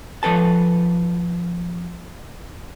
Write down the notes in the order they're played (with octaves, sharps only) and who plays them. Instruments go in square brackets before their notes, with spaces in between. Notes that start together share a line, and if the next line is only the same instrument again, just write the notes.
[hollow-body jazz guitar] F3 A4 B4 A5